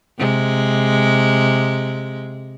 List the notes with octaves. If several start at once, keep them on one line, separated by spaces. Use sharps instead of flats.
C3 G#3